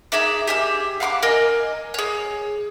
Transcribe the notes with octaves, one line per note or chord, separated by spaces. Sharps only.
D#4 G#4 E5 D6
G4 G#4 E5
F5 F#5 C6 D6
A#4 D#5 G#5
G#4 C#5